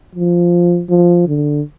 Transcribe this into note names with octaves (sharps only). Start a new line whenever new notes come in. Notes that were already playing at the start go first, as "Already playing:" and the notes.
F3
F3
D3